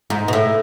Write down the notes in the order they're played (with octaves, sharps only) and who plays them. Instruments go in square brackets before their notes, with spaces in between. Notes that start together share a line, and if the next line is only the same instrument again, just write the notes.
[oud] G#2
B2
A2